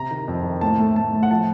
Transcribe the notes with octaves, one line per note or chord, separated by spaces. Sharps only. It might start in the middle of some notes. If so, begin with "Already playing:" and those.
Already playing: C3 A#5
D#3
F2
D#3
A2 A5
A3
A2 A5
A2
F#5
F3 A5